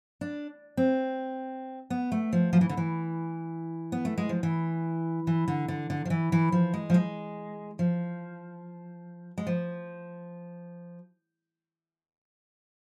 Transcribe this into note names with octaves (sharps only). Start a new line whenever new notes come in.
D4
C4
B3
A3
F3
F3
E3
D3
E3
B3
A3
G#3
F3
E3
E3
D3
D3
D3
F3
E3
E3
F3
G#3
F3
G#3
F3
G#3
F3